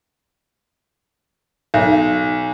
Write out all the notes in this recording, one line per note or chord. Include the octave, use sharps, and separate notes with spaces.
B1